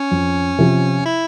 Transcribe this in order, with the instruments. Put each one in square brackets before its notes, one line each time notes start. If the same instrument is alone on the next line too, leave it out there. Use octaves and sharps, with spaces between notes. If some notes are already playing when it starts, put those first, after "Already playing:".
Already playing: [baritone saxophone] C#4
[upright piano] F2
C3 F3
[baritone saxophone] E4